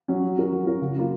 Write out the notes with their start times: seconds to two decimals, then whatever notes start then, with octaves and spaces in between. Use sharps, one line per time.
0.08 F#3 C#4
0.23 F#3
0.38 C#4 F#4 A#4
0.52 F#3
0.67 C#4 F#4 A#4
0.82 C#3
0.96 F#3 A#3 F4